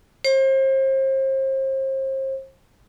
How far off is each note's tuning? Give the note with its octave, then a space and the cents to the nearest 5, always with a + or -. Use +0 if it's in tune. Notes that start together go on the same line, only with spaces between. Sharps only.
C5 +35